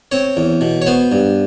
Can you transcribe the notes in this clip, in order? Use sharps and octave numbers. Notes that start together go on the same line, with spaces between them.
C4 C#5
E2
B2
C#5
B3 C5
G2